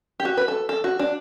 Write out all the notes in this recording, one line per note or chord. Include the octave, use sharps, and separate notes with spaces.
G4
F#4
B4
A4
A4
F#4
D4